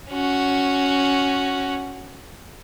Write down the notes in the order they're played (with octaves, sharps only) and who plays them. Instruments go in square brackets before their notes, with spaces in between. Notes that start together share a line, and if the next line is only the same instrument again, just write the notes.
[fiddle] C#4 F#4